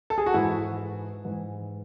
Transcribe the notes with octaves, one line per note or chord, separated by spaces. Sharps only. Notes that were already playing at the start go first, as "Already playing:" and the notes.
A4
G#4
F#4
G#2 E3 E4
G#2 E3